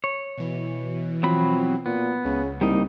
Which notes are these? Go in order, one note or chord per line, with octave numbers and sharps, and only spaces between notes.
C#5
B2 E3
F3 F#3 C4 B5
A#2 B3
C#2 C#3
C2 G3 A#3 D#4